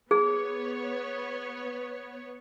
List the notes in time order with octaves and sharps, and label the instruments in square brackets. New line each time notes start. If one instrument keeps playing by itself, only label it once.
[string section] B3 C#5 [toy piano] G#4